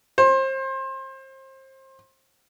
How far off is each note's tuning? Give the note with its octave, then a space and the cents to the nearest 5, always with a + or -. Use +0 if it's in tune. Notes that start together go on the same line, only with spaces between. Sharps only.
C5 +30